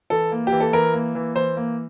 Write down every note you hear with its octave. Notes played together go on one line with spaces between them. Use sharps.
E3 A4
A#3
G4
E3
A4
E3 A#4
A#3
E3
E3 C5
A#3